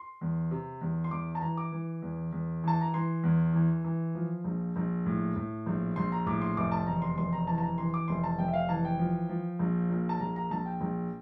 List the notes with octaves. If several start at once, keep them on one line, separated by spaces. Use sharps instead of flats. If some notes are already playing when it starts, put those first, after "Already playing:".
Already playing: C6
E2
C3
E2
C6
E2 D6
A5
E3 A#5
D6
E3
E2
E2
E3 A5
A#5
E3 C6
E2
E3
E3
F3
A#1
A#1
A2
A2
A#1
A#1 C6
A#5
A2 D6
C6
F1 D6
A5
E2 A#5
C6
F1 C6
A#5
E3 A5
A5
A#5
E3 C6
D6
F1 C6
A5
F1 G5
E5
F5
E3 A5
G5
F3
F3
A#1
A#2
A5
A#1 A#5
A#5
A#1 A5
G5
A#1